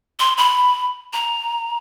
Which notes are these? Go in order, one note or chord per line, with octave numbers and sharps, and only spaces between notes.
C6
B5
A#5